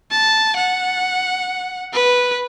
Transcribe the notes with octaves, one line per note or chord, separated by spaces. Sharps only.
A5
F#5
B4